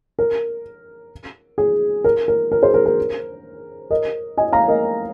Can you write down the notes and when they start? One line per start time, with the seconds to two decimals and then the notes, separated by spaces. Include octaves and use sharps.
0.19 A#4
1.58 G#4
2.04 A#4
2.28 A#4
2.52 A#4
2.62 G#4 C5
2.74 A#4
2.86 A#4
3.90 A#4 D#5
4.37 D#5 G#5
4.53 F5 A#5
4.68 A#4 D#5